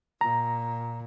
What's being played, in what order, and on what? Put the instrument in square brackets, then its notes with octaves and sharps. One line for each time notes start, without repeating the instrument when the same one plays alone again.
[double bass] A#2 [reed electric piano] A#5